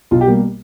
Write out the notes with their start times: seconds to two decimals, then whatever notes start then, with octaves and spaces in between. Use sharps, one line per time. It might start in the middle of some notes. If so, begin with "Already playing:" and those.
0.11 B1 F4
0.21 G4
0.27 B2 G3 A#3